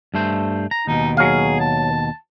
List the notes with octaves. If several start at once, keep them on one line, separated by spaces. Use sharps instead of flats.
G2 A3 C5
A#5
D#2 B2 D#4
F#3 G#4 F5
A5